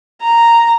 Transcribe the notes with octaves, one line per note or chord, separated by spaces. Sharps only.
A#5